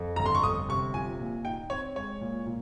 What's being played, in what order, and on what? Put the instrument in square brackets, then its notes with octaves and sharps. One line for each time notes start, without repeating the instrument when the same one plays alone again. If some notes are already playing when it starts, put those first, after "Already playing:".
Already playing: [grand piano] F2
[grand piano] G1 [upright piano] A#5
[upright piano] C6
C#6
[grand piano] G1 [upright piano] D#6
[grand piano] C3 [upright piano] C#6
[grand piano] F3 [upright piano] G#5
[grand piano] A#2
[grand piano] D#4 [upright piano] G5
[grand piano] C4 [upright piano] C#5
[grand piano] G#3 [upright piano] C#5
[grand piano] A#2
A#2